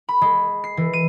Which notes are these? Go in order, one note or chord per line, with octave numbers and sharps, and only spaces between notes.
B5
G#3
C7
E3
D#7